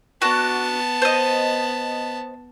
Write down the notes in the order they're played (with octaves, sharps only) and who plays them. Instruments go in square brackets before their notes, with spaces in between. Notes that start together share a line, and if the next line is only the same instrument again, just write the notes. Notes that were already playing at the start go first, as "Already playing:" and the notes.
[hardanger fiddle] B3 A5 [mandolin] D4 F#4
[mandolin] C5 D#5